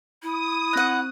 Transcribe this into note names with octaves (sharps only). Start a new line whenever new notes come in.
E4 D#6
C4 D#4 F#5 F#6